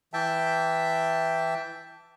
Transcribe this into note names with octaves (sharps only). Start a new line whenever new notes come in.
E3 E5 G5 A5